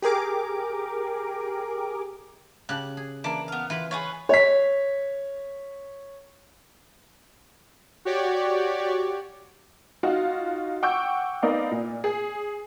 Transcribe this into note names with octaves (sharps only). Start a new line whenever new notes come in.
G4 G#4 A#4 D6
C#3 G4 A5 F#6
G#4
E3 A#3 D4
B3 F5
E3 F4 B4 B5
F4 G#4 B4 C#5
C#5 B6
F#4 G4 C#5 D5
D#4 F4 F#4
F#5 G5 C#6 D6 E6 G6
B3 D#4 A#4 D5 D#5 F5
A#2
G#4